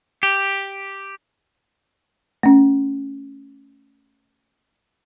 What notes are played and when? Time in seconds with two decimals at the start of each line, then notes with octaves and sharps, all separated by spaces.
0.23 G4
2.43 A3 C#4